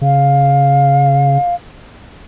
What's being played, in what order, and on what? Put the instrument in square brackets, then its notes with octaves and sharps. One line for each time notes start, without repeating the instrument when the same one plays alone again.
[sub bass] C#3 [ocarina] F5